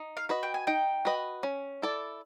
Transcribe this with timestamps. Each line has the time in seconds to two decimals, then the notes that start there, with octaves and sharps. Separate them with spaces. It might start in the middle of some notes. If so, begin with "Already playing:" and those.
Already playing: D#4
0.17 F5
0.29 F#4 B4 D#5
0.43 G5
0.54 G#5
0.67 D#4 G5
1.05 F#4 B4 D#5
1.43 C#4
1.82 E4 A4 D5